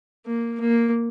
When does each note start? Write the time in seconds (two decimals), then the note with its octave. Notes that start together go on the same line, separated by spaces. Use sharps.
0.26 A#3
0.61 A#3